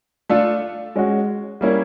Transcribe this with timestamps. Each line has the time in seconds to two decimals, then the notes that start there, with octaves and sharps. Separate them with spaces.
0.29 A3 D4 F4 A4
0.96 G#3 C#4 F#4
1.61 G3 A#3 C#4 E4